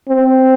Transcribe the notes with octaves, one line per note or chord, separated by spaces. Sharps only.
C4